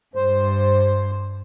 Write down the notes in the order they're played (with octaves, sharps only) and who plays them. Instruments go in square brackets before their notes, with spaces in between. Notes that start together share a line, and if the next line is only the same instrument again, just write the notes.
[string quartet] G2 [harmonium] C5